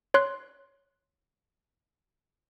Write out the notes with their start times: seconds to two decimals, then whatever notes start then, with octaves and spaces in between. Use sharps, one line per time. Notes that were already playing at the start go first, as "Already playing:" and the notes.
0.14 C#5 C6 F#6